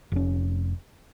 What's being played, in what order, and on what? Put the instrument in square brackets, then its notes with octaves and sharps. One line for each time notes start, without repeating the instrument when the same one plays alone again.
[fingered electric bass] F1 C#4